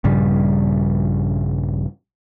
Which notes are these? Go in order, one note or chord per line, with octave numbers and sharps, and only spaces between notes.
A#1 G2 C#3 G3